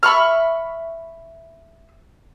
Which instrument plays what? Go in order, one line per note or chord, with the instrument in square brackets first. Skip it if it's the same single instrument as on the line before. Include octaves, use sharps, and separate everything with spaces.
[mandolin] E5 B5 C#6 F6